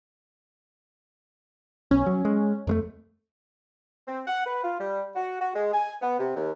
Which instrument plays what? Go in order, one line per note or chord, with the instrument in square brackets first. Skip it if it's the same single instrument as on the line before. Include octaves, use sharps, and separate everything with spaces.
[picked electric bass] B1 [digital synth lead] C#4
[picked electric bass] F#3
G#3
F2 G#3 A3
[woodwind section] C4
F#5
B4
F4
G3
F#4
F#4
G#3
G#5
B3
C3
D#2